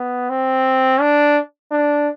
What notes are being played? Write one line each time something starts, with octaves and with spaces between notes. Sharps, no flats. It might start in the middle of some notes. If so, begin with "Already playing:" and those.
Already playing: B3
C4
D4
D4